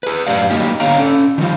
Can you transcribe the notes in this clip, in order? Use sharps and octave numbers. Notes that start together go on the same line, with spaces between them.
G#4 B4
F#2 A2 D#3 G4 D5 F5
F#3 G3 A#3 D#4 G4
D3 B3 C#5 F5 G5 A#5
C#4 A4
D#3 F3 G3 F4